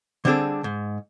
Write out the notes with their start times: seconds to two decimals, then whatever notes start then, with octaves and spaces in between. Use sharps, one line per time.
0.25 D3 G3 C4 D4 G#4 A4
0.64 G#2